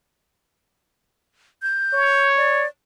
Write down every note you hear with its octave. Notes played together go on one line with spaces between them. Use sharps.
G6
C#5
D5